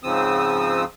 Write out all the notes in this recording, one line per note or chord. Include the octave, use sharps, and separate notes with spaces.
G#2 C#3 F3 C4 D#6 E6